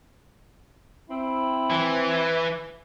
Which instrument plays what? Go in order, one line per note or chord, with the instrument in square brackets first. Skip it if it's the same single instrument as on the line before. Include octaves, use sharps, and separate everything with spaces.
[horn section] C4 E4
[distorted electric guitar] E3